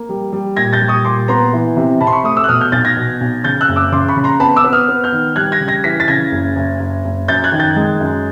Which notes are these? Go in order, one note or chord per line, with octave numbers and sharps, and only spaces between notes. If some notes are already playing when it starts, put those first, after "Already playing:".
Already playing: A#3
G3
G3
A#2 G#6 A#6
G6 A6
G3
C#6 D#6
A#2 C6 D6
B3 A#5 C6
E3
C3
C3 A5 B5
C6
B5 C#6
A3 C#6 D#6
D6 E6
F#6
B2 D#6 F6
F6 G6
B1 G6 A6
G#6 A#6
B2
B1
C#3 G6 A6
E6 F#6
F#1
D6 E6
C#3 C6 D6
B5 C#6
C#3
A#5 C6
B3 A5 B5
D6 E6
B3
D#6 F6
B3
F6 G6
D#3
G3 F#6 G#6
G#6 A#6
C#3
G#6 A#6
E3 B6
A6 B6
C#3 G#6 A#6
F#1
F#1
F#1
F#1
F#2 G6 A6
F#6 G#6
D#3
G6 A6
G#3
F#2